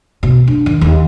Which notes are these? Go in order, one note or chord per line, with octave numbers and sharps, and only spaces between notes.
B2
D4
D#3
D#2